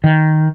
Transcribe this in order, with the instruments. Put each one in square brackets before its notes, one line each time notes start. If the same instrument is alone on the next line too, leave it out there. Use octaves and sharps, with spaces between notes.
[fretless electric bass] D#3